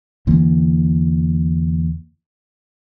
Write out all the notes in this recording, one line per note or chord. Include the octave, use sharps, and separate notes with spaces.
E2 D3 E3 A#3